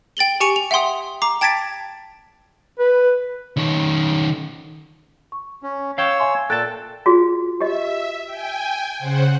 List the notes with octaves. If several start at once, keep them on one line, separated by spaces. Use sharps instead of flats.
G5 A6 F#7 G7
G4 G#5 C#6 C#7 D#7 F7
F7
E5 F#5 G5 C6 D#6
A#5 D6 C7
G5 A5 G#6 A6 B6 D7
B4
D#3 C#4
C#6
C#4
C#5 F5 G5 E6
E5 G#5 C6
A#2 A4 G5 A5 F#6 A6
F4 F#4 G#4
G4 D#5 E5
G5 G#5
C#3 C5 F#5